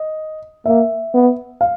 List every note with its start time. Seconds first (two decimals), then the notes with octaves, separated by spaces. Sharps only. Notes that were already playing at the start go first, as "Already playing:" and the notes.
Already playing: D#5
0.66 A#3 E5
1.14 B3
1.61 F5